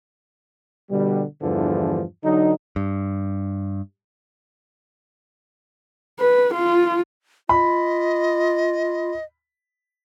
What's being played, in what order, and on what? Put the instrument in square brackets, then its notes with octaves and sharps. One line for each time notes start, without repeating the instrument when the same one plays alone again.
[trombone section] B2 D3 G3
E2 G2 D3 E3 F3
D3 F#3 D#4
[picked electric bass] G2
[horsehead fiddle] B4
F4
[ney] F4 [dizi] D#5 [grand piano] B5